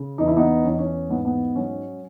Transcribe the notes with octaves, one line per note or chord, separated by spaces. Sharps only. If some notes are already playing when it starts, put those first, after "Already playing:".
Already playing: C#3
E2 D#4
E4
B3 D#4
E2 C#4
D#4
C#4
G#2 B3
B3
F#3 C#4